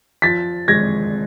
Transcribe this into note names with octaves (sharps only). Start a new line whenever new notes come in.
F3 A6 B6
G#3 G#6 A#6